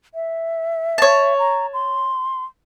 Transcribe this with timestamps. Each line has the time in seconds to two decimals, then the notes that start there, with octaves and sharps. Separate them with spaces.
0.15 E5
0.98 C#5 A5
1.38 A#5
1.74 C6